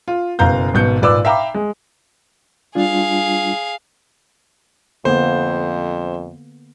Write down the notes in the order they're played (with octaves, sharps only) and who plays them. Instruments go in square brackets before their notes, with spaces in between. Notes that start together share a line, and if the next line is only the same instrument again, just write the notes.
[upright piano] F4
F#1 B2 F5 A#5 G6
G#1 B2 G6 C#7
G#1 A#2 B4 D5 D6 E6
E5 F5 G5 A#5 B5 D6
G#3
[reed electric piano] G3 D4 F4 [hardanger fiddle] G#4 F5
[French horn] F2 [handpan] D3 A#3 B3 [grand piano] C5